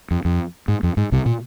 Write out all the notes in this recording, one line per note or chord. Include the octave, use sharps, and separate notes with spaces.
F2
F2
G#2
F2
G#2
C2 C3
A#2